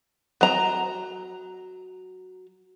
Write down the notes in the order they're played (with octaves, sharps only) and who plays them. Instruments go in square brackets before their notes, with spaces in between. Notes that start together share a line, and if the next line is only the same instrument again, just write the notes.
[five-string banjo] F#3 A#5